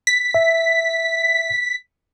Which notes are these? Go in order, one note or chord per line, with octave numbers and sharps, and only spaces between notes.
B6
E5